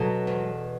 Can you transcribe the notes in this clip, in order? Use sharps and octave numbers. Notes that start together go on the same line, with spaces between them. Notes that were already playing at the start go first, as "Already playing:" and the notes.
Already playing: B2 F#3 A4
E2